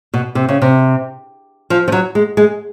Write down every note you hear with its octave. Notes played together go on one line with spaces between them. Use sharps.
B2
C3
C#3
C3
F3
F3
F#3
G#3
G#3